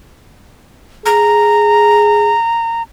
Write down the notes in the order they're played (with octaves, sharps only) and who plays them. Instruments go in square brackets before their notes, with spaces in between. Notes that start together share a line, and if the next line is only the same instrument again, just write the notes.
[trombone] G#4 [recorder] A#5